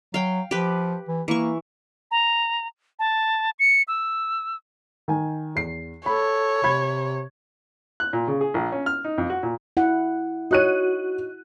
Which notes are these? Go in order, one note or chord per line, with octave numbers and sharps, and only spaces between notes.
F#3 F5 G5
F3 G4 B4
E3
E3 A#3 C#6
A#5
A5
C#7
E6
D#3 G#5
E2 C7
A4 C#5 B5
C3 B5 G#6
F#6
A#2
C#3
G#4
A#1
C#4
F6
D#4
F2
F#4
A#2
E4 F#5
D#4 F#4 C#5 F#6 D#7